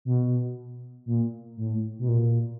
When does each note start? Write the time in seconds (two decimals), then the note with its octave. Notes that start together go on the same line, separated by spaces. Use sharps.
0.05 B2
1.06 A#2
1.57 A2
1.99 B2
2.08 A#2